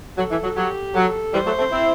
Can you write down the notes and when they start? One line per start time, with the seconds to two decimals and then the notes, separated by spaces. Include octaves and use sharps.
0.18 F#3 A4
0.31 E3
0.44 F#3
0.57 F#3 G4
0.95 F#3 A4
1.33 E3 G3 C5
1.46 F#3 A3
1.59 A3 C4
1.72 C4 E4